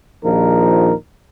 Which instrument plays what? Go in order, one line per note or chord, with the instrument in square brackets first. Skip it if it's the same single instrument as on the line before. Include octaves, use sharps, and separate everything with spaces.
[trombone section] A#1 D#2 F3 D#4 A#4